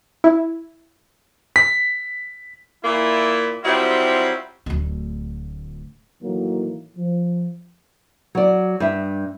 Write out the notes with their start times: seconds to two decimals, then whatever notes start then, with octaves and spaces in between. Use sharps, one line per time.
0.24 E4
1.56 B6
2.84 A#2 A#3 E4
3.64 F#3 G3 C4 E4 F4 G4
4.66 D1 D2
6.22 A2 D#3 E3 F#3 A3 A#3
6.97 F3
8.35 F#3 D5
8.80 G2 E5